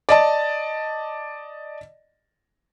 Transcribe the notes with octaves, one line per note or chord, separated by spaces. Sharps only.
D5 D#5 A5